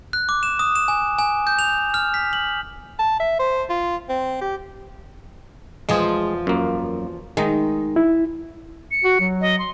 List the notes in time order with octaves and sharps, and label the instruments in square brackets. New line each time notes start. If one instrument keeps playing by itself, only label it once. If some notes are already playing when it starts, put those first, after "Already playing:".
[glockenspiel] F#6
D6
E7
D#6
E7
G#5
G#5
G6
F7
F6
B6
F#7
[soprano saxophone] A5
E5
C5
F4
C4
G4
[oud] E2 F3 [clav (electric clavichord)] G#3 G#4
[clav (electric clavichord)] F#2 A#3
[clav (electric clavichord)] D#3 G#3 [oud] D#4
[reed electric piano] E4
[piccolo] C#7
[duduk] F#4
F#3
[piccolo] D#5
C6